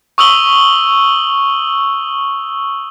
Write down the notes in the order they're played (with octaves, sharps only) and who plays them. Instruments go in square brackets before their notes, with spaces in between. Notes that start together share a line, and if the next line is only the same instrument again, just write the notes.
[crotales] C#6 D#6 E6 F#7 G7